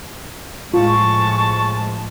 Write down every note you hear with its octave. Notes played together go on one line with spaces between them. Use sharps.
A2 F3 G#3 F4 A5 C#6